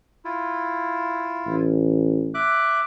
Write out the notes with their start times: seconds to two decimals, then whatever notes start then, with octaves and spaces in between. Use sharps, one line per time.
0.25 E4 F4
1.47 A1
2.34 E5 D6 F#6